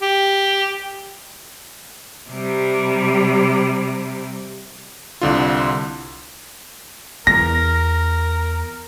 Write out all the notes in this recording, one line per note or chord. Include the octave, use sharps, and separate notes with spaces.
G4
C3 G3
C2 D3 F4
E2 B3 A#4 A#6